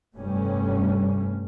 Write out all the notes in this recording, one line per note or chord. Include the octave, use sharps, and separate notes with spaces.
F1 G2 G3 A3 C#4